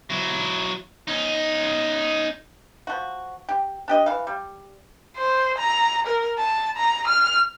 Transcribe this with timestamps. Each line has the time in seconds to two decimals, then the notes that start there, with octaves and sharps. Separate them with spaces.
0.10 F#3 E4
1.08 C#4 D#4
2.87 F3 F#4
3.49 G4
3.88 D4 G4 D#5
4.06 E3 F5
4.27 G3
5.17 C5
5.58 A#5
6.07 A#4
6.39 A5
6.77 A#5
7.07 F6